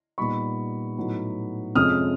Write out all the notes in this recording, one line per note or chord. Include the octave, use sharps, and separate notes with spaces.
A#2 G3 B3 D#4 B5 C#6
A2 F#3 B3 D#4
F2 C3 F3 G#3 C#4 D#6 F6